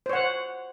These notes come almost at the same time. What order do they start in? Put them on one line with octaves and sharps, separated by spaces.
C5 C#5 F#5